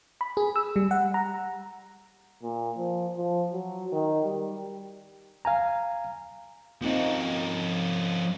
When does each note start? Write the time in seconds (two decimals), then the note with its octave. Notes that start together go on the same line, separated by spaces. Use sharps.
0.21 B5
0.37 G#4
0.56 E6
0.76 G3
0.91 F#5
1.14 A#5
2.43 A#2
2.78 F3
3.17 F3
3.53 F#3
3.92 D#3
4.25 G3
5.45 F5 G#5 A#5
6.81 F3 A#3 C4 C#4 D#4